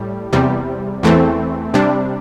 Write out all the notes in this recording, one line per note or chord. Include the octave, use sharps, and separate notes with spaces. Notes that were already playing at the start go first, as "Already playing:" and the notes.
Already playing: A2 G3
E2 C3 G3
E2 E3 A3 C4
C3 G3 D4